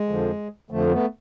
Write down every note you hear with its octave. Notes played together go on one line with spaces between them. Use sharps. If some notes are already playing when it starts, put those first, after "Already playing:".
Already playing: G#3
F2 D3 F3
F2 D3 F3 A3
A3 B3